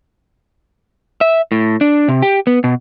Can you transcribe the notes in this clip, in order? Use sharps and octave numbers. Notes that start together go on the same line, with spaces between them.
E5
A2
D4
C3
G4
B3
B2